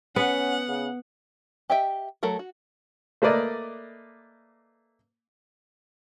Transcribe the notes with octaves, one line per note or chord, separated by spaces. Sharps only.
B3 C#4 F#5
C#3
G4 D#5 E5 G5
F#3 A3 A4 A#4
F#4
A3 A#3 B4 D5 D#5